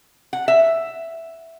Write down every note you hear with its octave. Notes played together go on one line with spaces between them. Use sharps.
F#5
E5